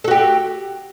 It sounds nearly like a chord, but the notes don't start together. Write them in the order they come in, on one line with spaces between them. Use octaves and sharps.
A4 F#4 G4